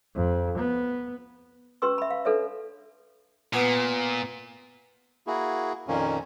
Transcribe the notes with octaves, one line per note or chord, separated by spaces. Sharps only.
F2
B3
C#4 G4 B4 C6 E6
E5 B5
F5
D4 A4 B4 C#5 E5
A#2 B3 F4 G#5
A#3 E4 F#4 G#4
F2 A#2 D#3 F3 A#3 C#4